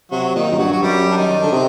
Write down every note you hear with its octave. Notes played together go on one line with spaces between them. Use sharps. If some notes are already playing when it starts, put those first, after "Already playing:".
C3 F#3 F#4
A#2 D#3 D#4
F#2
G2 F#3 F#4
F#4
F#2 G3 G4
D4
D#3 D#4
D3 D4
C3 D#3 D#4